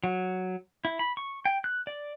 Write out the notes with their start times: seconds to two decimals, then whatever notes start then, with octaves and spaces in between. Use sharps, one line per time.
0.04 F#3
0.85 E4
0.99 B5
1.17 C#6
1.45 G5
1.64 F#6
1.87 D5